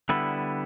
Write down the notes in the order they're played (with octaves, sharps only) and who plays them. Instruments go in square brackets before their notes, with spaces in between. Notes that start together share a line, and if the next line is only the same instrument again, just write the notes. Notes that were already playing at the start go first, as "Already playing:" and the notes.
[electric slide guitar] D3 G3 B3 E4